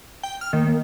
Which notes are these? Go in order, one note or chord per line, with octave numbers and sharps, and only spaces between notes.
G5
F6
D#3 A#3
A#3